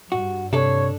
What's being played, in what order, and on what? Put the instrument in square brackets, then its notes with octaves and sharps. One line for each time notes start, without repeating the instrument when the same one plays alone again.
[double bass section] G2 [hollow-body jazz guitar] F#4
[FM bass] C3 [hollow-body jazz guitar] D4 A4 [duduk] C#5